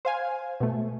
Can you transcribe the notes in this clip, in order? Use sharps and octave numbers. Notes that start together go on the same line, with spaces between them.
C5 F5 G#5
B2 A3